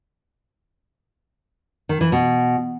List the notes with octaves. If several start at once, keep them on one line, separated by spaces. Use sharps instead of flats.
D#3
E3
B2